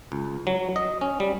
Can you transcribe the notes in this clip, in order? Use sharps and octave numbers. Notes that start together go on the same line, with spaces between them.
C#2
F#3
D#5
C#4
G3